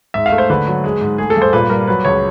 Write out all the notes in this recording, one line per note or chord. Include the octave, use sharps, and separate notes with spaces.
G#2 E5
F5
A3
C5
D3 B4
F#3
G#3
G#2
A3 G#4
A4
G2
C5
A#2 B4
G3 A#4
F#3 B4
C#2 C#5